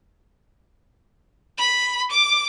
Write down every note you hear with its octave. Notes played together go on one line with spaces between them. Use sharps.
B5
D6